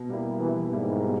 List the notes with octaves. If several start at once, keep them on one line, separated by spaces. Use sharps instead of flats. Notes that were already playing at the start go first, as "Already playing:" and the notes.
Already playing: B2
G3 A#3 E4
B2 E3
G#2 G3 A#3 E4
B2